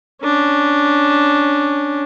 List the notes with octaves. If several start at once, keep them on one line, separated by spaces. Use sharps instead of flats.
C#4 D4